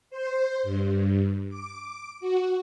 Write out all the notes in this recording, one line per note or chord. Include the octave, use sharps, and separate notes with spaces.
C5
G2
D6
F#4